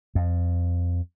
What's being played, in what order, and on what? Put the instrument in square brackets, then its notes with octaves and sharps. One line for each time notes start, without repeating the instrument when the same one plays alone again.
[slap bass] F2